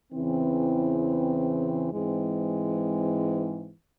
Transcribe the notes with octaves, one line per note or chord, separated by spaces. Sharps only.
E2 C#3 E3 C4
G#2 E3 G#3 C4